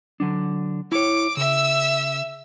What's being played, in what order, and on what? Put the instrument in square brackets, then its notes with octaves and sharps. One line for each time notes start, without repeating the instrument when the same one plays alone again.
[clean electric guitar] D3 F#3 D4
[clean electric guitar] E4 C#5 [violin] D6
[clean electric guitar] C#3 [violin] E5 E6